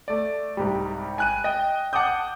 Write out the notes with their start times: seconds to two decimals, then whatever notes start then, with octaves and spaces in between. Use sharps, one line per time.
0.08 A3 D5
0.57 C2 G#2 G3
1.18 G#5 F#6 D#7
1.44 D#5 G5
1.93 F#5 A5 D6 D#6 G6